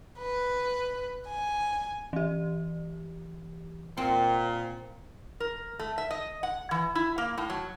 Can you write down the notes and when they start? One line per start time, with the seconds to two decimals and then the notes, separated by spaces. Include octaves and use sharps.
0.18 B4
1.28 G#5
2.13 E3 G4
3.97 A#2 C4
5.40 A#4
5.79 A3
5.98 E5
6.11 D#5
6.43 F#5
6.71 E3
6.95 E4
7.18 A#3
7.38 A2
7.50 F#3